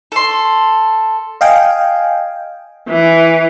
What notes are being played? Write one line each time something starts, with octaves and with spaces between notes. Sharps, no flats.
A4 C6
D#5 F5 G5 G#5
E3